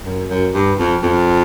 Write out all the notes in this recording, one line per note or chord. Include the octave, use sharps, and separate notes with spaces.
F#2
F#2
G2
F2
F2